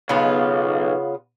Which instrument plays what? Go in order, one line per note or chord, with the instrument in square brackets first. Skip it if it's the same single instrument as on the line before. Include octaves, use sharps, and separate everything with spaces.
[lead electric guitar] B1 [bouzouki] C#3 B3 F4